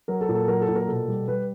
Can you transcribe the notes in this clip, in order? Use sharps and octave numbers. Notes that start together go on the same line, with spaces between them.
F#3 A#4
A4
A#2
A4
F#3 A#4
A4
A#2
A#4
B2 A4
G3
G3 B4